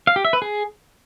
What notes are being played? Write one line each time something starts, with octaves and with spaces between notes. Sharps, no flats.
F5
G4
E5
B4
G#4